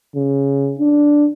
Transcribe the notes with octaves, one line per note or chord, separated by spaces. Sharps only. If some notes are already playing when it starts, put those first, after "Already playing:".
C#3
D4